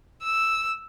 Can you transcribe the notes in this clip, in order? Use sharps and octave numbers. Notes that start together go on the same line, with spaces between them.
E6